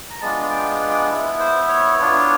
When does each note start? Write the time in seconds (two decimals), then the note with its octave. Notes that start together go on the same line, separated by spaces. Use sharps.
0.10 A#5
0.21 G#3 B3 D4 F4 A5
0.50 G5
0.80 F#5
0.90 G5
0.99 F#5
1.10 B3 E4
1.40 C5
1.69 C#5
1.99 B3 D4 F4